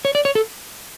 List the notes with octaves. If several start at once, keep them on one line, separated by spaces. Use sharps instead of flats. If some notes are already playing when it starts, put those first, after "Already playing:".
C#5
D5
C#5
A4